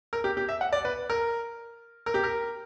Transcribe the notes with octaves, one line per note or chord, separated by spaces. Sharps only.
A#4
G4
G4
E5
F#5
D5
B4
A#4
A#4
G4
A#4